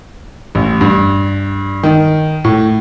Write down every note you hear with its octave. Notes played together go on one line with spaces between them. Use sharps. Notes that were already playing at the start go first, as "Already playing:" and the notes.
A1
G2
D#3
A2